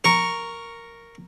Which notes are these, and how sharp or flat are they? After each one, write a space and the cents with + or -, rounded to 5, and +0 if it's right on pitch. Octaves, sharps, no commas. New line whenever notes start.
A#4 -5 C#6 +0